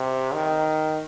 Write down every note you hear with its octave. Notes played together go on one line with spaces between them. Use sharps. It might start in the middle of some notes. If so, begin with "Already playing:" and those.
Already playing: C3
D#3